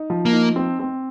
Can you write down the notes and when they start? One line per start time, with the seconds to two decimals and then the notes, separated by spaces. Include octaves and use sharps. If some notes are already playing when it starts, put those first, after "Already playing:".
Already playing: D#4
0.10 F3
0.25 A#3
0.33 D#4
0.56 C4
0.79 C4